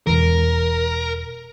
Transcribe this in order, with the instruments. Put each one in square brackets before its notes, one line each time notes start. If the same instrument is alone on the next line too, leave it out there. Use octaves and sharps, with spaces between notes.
[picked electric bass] E1 C#2 E3 [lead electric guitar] A#4